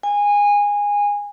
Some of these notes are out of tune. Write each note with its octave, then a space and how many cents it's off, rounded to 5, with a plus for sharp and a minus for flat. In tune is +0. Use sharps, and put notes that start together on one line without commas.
G#5 -20